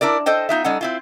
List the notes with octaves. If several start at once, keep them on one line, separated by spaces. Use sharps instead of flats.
D4 E4 A#4 D5
A4 C5 D#5 G5
B3 D#4 F4 E5
G3 C#4 D#4 A4 F#5
C4 E4 F4